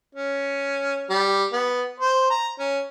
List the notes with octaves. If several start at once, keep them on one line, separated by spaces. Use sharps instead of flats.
C#4
G3
B3
C5
A#5
C#4